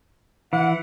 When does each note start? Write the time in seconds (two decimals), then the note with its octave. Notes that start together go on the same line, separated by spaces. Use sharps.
0.53 E3 F#5